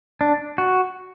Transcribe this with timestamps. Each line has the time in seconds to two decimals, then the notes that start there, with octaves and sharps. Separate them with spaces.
0.21 D4
0.58 F#4